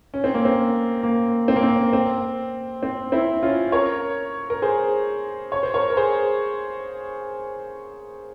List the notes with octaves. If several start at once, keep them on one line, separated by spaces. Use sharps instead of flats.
C#4
C4
A#3
C4
A#3
C4
A#3
C4
C4
C4
C4 E4
C#4 F4
A#4 C#5
A#4
G#4 C5
C#5
C5
A#4 C#5
A#4
G#4 C5